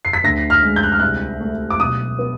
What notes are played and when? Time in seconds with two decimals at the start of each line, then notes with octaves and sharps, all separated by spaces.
0.05 C7
0.13 B6
0.23 D2 A#6
0.50 F6
0.63 G#3
0.76 G6
0.83 F#6
0.92 F6
1.00 C2 F#6
1.41 A3
1.70 D6
1.80 B1 D#6
2.19 B3